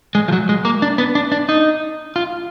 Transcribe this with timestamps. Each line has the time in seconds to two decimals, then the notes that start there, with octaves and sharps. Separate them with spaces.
0.15 G#3
0.28 F3
0.32 F#3
0.49 G#3
0.65 A#3
0.82 D4
0.98 B3
1.15 D4
1.32 D4
1.49 D#4
2.16 F4